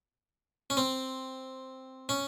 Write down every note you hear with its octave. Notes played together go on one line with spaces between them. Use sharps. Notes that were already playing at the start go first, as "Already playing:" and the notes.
C#4
C4
C#4